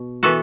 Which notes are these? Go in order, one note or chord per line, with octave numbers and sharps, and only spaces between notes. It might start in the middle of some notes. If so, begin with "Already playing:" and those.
Already playing: B2
E3 B3 F#4 A4